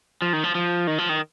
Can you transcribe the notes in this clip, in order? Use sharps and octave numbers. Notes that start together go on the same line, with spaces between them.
F3
D#3
F3
F3
D#3
F3
D#3